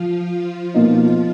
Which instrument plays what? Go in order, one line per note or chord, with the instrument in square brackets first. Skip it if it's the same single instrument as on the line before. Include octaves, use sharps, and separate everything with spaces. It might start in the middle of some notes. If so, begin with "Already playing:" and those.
Already playing: [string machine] F3 F4
F3 F4
[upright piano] B2 A#3 D#4